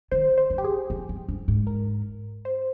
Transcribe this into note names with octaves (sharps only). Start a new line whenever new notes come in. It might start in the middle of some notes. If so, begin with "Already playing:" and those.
D#3 C5
C5
G2
G4
G#4
F2
G2
G2
G#2
A#4
C5